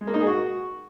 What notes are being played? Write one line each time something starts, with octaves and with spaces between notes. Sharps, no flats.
G#3
A#3
D#4
G#4
F#4